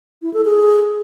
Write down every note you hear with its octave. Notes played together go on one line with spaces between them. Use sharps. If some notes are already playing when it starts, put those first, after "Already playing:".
E4
A4
G#4